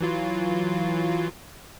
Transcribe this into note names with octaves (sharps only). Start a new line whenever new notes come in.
E3 F#3 F4